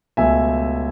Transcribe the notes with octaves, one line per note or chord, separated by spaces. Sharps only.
C#2 B2 A3 E5 G#5